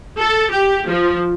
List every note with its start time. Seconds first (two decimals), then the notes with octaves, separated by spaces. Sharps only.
0.19 A4
0.50 G4
0.86 F3